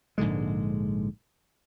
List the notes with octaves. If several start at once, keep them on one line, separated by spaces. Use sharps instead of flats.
A#1 G#2 D3 G#3